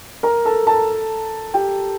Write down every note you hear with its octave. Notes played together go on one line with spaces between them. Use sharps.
A#4 A#5
A4 A5
A4 A5
G4 G5